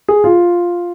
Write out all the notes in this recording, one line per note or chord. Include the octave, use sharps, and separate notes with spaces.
G#4
F4